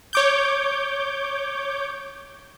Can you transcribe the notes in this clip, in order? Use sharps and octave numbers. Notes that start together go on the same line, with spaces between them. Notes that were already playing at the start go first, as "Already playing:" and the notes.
C#5 D6 G6